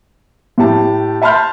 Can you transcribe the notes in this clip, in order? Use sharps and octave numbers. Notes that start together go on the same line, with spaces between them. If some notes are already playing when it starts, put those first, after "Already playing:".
A2 G4 A5
E5 A5 B5 C6 F6 G6